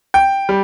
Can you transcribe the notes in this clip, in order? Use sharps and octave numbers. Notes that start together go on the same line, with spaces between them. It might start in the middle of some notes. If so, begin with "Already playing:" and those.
G5
G3